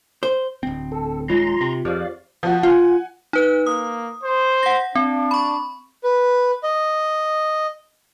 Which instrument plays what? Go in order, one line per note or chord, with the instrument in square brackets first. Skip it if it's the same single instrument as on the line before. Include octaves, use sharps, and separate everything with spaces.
[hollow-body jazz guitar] C5
[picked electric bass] D1 C4
[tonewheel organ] A4
[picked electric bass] D#1 F#3 G#3 [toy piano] D#4 F4 [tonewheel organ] A#5 C6
[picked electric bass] C3
[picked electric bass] F2 [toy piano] G4 G#4 C5 [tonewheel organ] D5 F5
[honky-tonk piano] F3 F#4
[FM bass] F4 [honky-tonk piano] F#5 G#5
[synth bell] D#4 B4 F#6
[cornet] A#3 [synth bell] D#6
[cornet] C5
[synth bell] F#5 A#6
[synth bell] C4 [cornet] D4
[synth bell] B5 C#6
[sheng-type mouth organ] B4
D#5